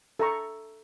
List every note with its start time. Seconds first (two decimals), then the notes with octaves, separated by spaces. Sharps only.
0.19 A4 E5 A#5 C#6